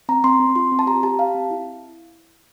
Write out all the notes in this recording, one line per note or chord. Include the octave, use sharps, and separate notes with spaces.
C4 A#5
C4 C6
C4
F4 C6
C4
A5
G4 A#5
G4 A5
G4 F5
C4
E4